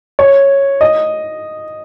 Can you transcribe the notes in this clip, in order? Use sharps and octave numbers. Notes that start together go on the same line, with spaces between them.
C#5
D#5